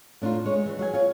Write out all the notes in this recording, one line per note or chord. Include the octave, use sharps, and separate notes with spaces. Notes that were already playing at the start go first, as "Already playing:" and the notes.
A2 D4 D#4 F4
G#3 C#5
E3
F#3 G#4 F5 G#5
F4 C#5